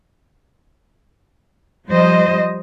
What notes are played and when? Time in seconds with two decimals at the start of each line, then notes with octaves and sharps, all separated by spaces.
1.88 F3 G3 C5 D#5